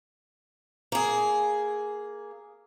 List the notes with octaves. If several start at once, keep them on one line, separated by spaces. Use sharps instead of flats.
A#3 G#4